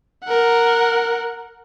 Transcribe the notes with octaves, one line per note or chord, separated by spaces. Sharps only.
A#4 F#5